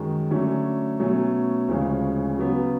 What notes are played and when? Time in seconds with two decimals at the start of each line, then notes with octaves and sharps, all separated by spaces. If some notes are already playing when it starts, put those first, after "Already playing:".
Already playing: F#2 D#3 G#3 C#4 F#4
0.31 D3 F#3 A3 C#4
0.99 B2 F#3 A3 C#4
1.69 D2 C#3 F3 G#3 C#4
2.38 C#3 F#3 B3